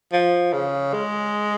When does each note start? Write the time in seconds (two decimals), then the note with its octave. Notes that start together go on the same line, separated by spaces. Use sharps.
0.13 F3
0.53 C#3
0.93 G#3